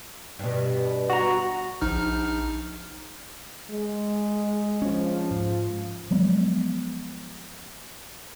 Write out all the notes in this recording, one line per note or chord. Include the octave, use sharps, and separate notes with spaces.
G2 B2
F#4 A#5
A#1 D#4 F6
G#3
F3 C#4
G#2
F3 F#3 G#3 B3